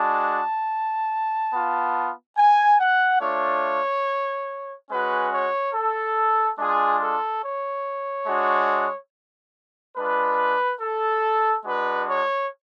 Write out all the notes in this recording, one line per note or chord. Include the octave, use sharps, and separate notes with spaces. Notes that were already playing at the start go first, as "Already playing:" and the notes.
Already playing: G#3 D4 F#4 A5
B3 F4
G#5
F#5
A3 D4 F4 C#5
G#3 C#4 F#4 B4
C#5
A4
G#3 D4 F4 G#4
A4
C#5
G#3 D4 F#4
G#3 D4 F4 B4
A4
G#3 D4 F#4 B4
C#5